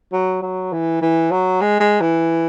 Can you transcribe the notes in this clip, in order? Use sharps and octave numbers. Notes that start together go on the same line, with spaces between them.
F#3
F#3
E3
E3
F#3
G#3
G#3
E3